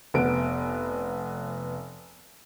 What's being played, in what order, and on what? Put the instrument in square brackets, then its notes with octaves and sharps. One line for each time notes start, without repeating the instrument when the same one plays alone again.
[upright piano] F1 B3 D7